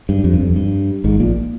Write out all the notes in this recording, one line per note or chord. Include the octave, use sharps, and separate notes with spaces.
G2
F2
G2
F2
G2
G#1 G#2
A#1 A#2